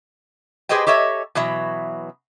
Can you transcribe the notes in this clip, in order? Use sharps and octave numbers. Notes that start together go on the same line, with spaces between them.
G4 G#4 B4 C5 D#5 G5
G4 A4 C#5 D#5 E5
B2 E3 F#3 E5